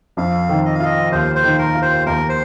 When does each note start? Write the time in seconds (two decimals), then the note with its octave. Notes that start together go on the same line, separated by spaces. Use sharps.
0.17 F2 F5
0.49 D#3
0.65 D#5
0.75 F5
0.80 F4 D#5
1.12 D#2 C5
1.35 C5
1.44 D#3
1.59 A#4
1.75 F4
1.82 C5
2.06 D#2 A#4
2.29 C5